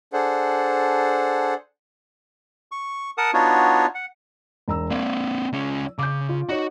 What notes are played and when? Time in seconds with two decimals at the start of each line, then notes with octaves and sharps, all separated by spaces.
0.13 D4 G#4 A4 C5 F#5
2.72 C#6
3.18 A#4 F#5 A5 D#6
3.34 B3 D4 D#4 F4 F#4 C#5
3.95 F#5
4.68 E1 A#5 E6
4.90 A#3 C4 D5
5.53 C#2 C#4
5.99 C#3 D6 G6
6.29 F4
6.49 D#4 F#4 C#5